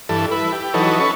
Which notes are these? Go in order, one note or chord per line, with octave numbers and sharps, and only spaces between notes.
G2 E3 A4
E4 B4
G4
E3 F#3 D#4 A4 B4 C#5
C#4 B4 A5 C#6